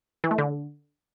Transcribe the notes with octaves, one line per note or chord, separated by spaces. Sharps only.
E3
A3
D3